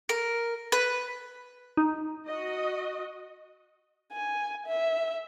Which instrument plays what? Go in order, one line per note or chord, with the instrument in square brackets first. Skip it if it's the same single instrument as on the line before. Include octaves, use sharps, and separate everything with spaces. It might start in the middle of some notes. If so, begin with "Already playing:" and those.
[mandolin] A#4
B4
[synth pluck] D#4
[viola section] F#4 D#5
[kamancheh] G#5
E5